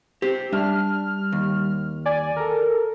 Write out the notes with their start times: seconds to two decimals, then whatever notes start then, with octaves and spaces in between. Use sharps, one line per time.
0.22 G4 C5
0.53 G3 D4 E5 F6
1.32 D#2
2.05 D5 G#5
2.36 A4 A#4